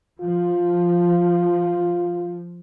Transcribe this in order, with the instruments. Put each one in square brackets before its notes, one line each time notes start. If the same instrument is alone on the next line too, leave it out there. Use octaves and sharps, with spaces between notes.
[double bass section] F3 [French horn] F4